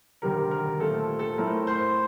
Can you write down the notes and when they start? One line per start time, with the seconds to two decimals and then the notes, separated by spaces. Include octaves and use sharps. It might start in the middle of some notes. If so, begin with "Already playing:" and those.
0.22 D2 C3 D#3 G3 A#4
0.51 A#4
0.80 A#2 A3 C4 A4
1.19 A4
1.38 A2 A3 C4 A#4
1.67 C5